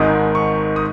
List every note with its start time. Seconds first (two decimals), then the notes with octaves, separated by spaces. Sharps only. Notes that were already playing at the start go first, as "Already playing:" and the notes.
Already playing: G#1 G#2 D#3 D#6
0.35 C#6
0.76 D#6